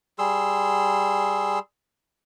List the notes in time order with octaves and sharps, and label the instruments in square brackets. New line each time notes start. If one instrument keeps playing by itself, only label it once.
[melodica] G3 G#4 C6 E6